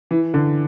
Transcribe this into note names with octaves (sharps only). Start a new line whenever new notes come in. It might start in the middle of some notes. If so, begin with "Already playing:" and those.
E3
D3